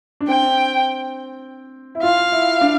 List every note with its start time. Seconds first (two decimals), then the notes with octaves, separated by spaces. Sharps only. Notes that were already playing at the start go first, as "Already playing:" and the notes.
0.21 D4
0.28 C4 G5
1.95 E4
2.03 F4 F5
2.32 E4
2.61 D4